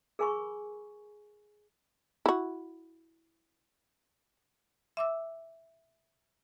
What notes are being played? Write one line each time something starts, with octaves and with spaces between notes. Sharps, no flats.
G#4 A#4 G#5 B5 C#6
E4 F#4
E5 D6 E6